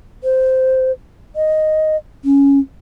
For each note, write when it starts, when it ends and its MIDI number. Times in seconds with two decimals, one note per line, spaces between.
0.24 0.92 72
1.36 1.96 75
2.25 2.59 61